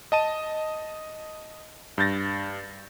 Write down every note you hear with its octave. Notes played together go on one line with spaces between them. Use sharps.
D#5 A5 D#7
G2 G6 A6 A#6